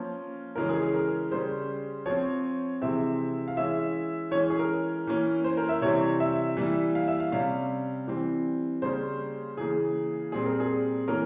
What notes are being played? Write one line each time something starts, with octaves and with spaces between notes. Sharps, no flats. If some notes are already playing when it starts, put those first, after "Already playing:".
Already playing: F3 A#3 C#4
C#3 E3 G#3 C#4 A#4
G#4
G#4
A#4
C#3 G3 C#4 C5
F3 C4 C#5
C3 E3 G#3 C4 E5
F5
E3 G#3 C#4 E5
E3 G#3 C#4 C#5
G#4
A#4
E3 A#3 C#4
C5
A#4
E5
C3 E3 G3 C4 C#5
E5
E3 G3 A#3
F5
E5
F5
C3 G3 C#4 F5
E3 G3 C4
C#3 G3 A#3 C#4 C5
C#3 E3 A#3 G#4
A#2 G3 C4 G#4
A#4
G#4
E3 A#3 C#4 A#4